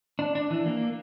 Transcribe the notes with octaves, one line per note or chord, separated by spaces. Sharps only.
D4
D4
E3
A#3